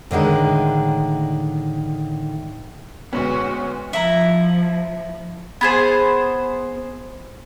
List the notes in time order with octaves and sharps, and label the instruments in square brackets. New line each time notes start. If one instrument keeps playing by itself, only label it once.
[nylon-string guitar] A2 D3 D#3 G#3
[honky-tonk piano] D2 G#3 C#4 [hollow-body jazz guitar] B3 [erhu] F#4
[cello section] F3 [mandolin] E4 A#5
[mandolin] B3 G#4 C5